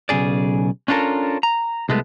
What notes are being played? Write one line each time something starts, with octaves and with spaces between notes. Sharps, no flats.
B1 A#2 C#3 G#4 D5
C#4 D4 F4 A4 A#4
A#5
C2 G#3 A3 B3